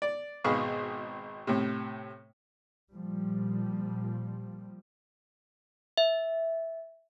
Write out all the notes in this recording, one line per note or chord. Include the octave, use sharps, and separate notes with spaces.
D5
G#1 B2 G#4 B4 F5 C#6
A2 C3
A#2 F3 G3
E5